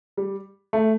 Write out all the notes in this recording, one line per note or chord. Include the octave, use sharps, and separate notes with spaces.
G3
A3